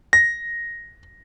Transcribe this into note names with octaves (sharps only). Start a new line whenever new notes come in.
A#6